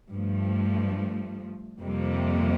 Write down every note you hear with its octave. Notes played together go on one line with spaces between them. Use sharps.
G2 F3 A3
F2 C3 G3 A#3